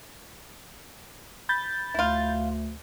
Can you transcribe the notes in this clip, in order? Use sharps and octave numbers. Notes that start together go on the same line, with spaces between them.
B5 G6 A6
D2 E4 F4